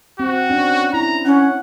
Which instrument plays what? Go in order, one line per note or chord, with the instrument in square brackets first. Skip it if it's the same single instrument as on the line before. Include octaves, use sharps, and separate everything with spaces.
[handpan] C4 [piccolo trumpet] F#4
[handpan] C#4 D4
[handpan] E4 [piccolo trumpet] A#5
[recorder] C#4 [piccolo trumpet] F#5